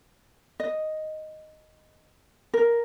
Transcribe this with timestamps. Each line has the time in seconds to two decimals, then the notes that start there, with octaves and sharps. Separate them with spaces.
0.60 D#5
2.54 A#4